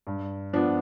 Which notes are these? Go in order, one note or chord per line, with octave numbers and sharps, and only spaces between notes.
G2
F3 B3 D4